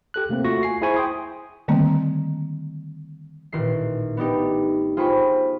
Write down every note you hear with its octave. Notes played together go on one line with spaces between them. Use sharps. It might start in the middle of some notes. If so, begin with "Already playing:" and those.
G4 A4 F#6
C3 A3 A#3 C4
A3 F4 F#4 C#6 A#6
G#5 C7
E4 G#4 C5 G#5 B5 C#6
G5 C6 D#6
D3 D#3 G3 A3 A#3 C4
A1 A#2 D#3 A3 C7
B3 D4 D#4 G4
F4 G#4 C5 G5 B5 C#6